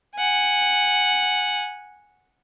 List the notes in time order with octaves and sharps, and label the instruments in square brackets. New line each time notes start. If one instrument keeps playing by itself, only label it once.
[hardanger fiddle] F#5 G#5